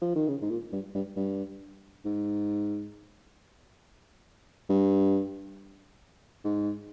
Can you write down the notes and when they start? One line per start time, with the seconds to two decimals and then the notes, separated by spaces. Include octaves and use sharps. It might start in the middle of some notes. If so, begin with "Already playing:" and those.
0.01 F3
0.15 D#3
0.28 C#3
0.42 G#2
0.50 A#2
0.72 G2
0.95 G2
1.16 G2
2.05 G#2
4.69 G2
6.45 G#2